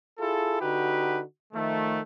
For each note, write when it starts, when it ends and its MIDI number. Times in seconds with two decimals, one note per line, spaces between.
0.19 0.58 64
0.19 0.58 65
0.19 0.58 68
0.19 0.58 69
0.61 1.22 50
0.61 1.22 63
0.61 1.22 66
0.61 1.22 67
0.61 1.22 71
1.53 1.99 51
1.53 1.99 53
1.53 1.99 57